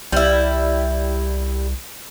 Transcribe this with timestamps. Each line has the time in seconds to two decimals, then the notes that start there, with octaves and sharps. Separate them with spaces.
0.12 C2 G3 E4